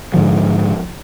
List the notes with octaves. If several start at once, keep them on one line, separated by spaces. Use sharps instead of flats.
G#2 D3 F3